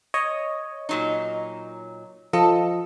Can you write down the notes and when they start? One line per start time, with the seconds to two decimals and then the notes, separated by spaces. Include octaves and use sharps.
0.14 C#5 D#5
0.89 A#2 F#3 D#4
2.33 F3 A4 D#5